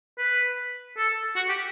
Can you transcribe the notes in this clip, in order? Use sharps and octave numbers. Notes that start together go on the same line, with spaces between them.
B4
A4
F#4
G4